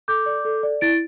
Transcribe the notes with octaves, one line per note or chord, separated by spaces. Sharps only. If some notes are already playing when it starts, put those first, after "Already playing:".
A4 D6 G6
D5
A4
D5
E4 A6 D7